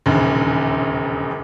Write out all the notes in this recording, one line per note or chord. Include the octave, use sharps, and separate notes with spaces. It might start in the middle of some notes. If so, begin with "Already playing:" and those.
E1 A#1 D#2 C#3